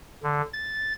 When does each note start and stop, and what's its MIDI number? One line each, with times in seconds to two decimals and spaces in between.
0.23 0.42 50
0.53 0.93 93